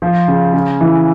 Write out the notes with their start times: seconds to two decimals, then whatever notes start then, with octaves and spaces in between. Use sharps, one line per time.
0.02 F3
0.28 C#3
0.53 C#3
0.81 E3